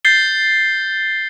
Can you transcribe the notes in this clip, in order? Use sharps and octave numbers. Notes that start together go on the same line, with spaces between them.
G6 A6 C7 G7